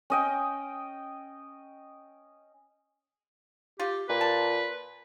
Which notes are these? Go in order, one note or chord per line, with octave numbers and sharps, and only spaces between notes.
C#4 D#5 G5
F4 G4
A#2 B4
A5